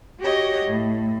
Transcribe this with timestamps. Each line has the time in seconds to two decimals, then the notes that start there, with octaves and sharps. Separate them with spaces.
0.19 F#4 G4 C#5 D#5
0.66 A2